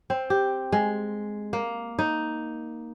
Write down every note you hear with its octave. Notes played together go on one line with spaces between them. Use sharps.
C4
G4
G#3
A#3
D#4